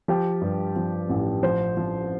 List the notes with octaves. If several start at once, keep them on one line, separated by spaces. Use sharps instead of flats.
F3 G4
G2
F3
A1
F3 C5
F3